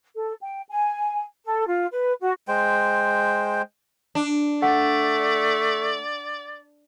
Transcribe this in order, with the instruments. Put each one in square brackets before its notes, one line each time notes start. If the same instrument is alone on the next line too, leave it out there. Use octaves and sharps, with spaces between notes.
[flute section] A4
G5
G#5
A4
F4
B4
F#4
[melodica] G#3 C5 G5
[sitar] D4
[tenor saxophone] A3 [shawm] D5 [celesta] F#5